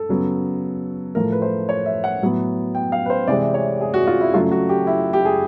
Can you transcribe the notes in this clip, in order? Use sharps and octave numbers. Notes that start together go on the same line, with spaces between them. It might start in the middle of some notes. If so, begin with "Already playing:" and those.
Already playing: A4
C#3 F#3 B3
A2 F3 A3 A#4
B4
C5
C#5
E5
F#5
A2 F#3 B3
G5
F5
B4
C5
C3 E3 G#3 C4 D5
C#5
G#4
F#4
F4
E4
C#3 F#3 A3 F4
F#4
G4
E4
G4
G#4